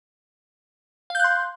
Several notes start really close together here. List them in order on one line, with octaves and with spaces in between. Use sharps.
F5 G6 F#6 C6